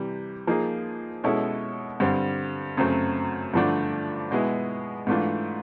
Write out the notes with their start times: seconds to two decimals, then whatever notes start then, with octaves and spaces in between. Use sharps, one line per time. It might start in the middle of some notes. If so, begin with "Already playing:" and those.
Already playing: C3 E3 G3
0.47 F3 A#3 D#4 G#4
1.24 B2 G#3 C#4 E4 A4
2.00 G2 D3 G3 C4
2.77 F#2 C#3 F#3 A3 C4
3.54 G2 D3 F3 A3 D4
4.31 B2 G#3 B3 E4 G#4
5.07 G#2 E3 A3 D4 F4